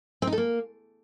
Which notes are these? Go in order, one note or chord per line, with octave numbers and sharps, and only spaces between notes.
C4
D#4
A4
A#3